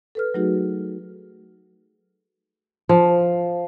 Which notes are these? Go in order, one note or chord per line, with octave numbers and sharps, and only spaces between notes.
A4 B4 F6
F#3 A3 D#4 F#4 G#4
F3